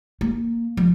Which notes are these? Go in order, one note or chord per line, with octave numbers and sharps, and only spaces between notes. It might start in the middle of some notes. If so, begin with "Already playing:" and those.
A#3
F3